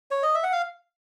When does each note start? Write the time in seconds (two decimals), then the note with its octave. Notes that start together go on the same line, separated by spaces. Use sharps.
0.11 C#5
0.23 D#5
0.35 E5
0.43 F#5
0.52 F5